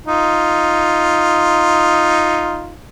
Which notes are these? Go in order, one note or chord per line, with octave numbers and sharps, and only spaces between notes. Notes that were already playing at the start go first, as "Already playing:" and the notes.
D#4 F4